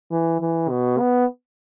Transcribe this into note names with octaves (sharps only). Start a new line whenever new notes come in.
E3
E3
B2
B3